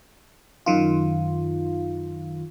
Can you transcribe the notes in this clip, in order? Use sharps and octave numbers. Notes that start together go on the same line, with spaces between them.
F#2 D#3 F4